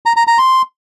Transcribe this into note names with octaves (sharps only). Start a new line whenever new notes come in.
A#5
A#5
A#5
C6